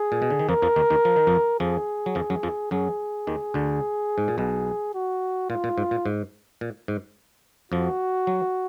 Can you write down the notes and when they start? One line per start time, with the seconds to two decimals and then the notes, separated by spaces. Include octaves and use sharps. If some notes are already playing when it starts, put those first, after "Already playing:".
Already playing: G#4
0.12 A#2
0.22 B2
0.30 D3
0.39 D#3
0.49 F2 F3 A#4
0.62 F2 F3
0.76 D#2 D#3
0.90 D#2 D#3
1.05 F3
1.16 D#3
1.27 F2 F3
1.60 F2 F3 G#4
2.06 F#3
2.15 F2 F3
2.30 F#2 F#3
2.43 F2 F3
2.71 F#2 F#3 G#4
3.27 D#2 D#3
3.54 D2 D3
4.18 G#2
4.28 A#2
4.38 B1 B2 G#4
4.94 F#4
5.50 A#2 F4
5.64 A#2
5.78 G#2
5.91 A#2
6.06 G#2
6.61 A#2
6.88 G#2
7.72 F2 F3 F#4
8.27 F#3